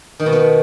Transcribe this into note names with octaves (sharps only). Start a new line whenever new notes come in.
D#3
B2
B3